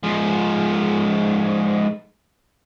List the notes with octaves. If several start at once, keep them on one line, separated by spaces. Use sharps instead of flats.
G#2 F3